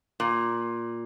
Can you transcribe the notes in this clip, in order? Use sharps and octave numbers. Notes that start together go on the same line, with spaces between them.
A#2